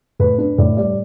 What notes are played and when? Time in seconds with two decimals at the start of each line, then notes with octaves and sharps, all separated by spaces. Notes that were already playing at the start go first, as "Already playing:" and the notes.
0.19 A2 B4
0.38 D4 B4
0.58 A2 D5
0.77 G3 D5